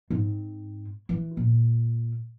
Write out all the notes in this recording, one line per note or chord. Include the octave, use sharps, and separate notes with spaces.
G#2 C4
E3
A#2